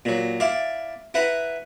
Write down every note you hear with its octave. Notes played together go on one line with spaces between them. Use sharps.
A#2 F#3
E4 D5 F5
E4 B4 F#5 A#5